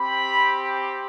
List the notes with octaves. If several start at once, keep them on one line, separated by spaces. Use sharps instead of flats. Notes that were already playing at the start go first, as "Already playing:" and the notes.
Already playing: C4 G4 B5